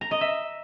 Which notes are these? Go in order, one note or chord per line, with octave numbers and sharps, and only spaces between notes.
A#5
D#5
E5